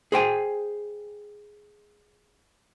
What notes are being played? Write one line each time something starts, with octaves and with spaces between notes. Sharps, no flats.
G#4 C5 G5 G#5